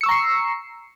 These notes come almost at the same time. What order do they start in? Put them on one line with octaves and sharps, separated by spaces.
C#7 E6 C#6 A#5 C7